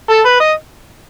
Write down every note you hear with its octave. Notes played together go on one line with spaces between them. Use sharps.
A4
B4
D#5